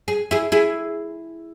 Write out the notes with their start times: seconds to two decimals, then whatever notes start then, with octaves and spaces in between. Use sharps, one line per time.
0.08 G#4
0.31 E4 G#4
0.52 E4 G#4